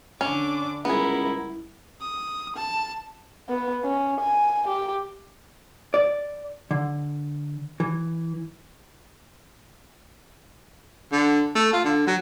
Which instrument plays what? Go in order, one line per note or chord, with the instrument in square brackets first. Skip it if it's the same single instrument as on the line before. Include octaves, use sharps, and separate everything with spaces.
[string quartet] D3 D4 D6 [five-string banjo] C#4
[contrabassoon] C#2 [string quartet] G3 A#4 [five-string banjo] B3 G#4 [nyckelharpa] E4
[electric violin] D#6
A5
[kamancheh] B3
C#4
G#5
G4
[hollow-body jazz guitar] D5
D3
E3
[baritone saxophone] D3
A3
F4
D3
F#3